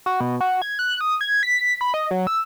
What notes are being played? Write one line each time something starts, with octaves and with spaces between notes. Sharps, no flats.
F#4
B2
F#4
G#6
F#6
D#6
G#6
B6
B5
D#5
F#3
E6